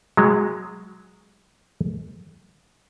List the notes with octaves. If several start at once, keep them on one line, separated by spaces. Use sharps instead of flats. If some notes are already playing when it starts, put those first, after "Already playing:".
F#3 G#3